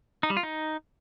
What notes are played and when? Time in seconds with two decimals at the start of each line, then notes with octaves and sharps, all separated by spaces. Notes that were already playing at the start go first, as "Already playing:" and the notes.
0.23 D#4
0.30 G3
0.37 F4
0.43 D#4